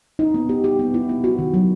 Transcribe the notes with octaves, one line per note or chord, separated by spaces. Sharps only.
D#4
B3
G4
G4
B3
E4
B3
F#4
D#3
F#3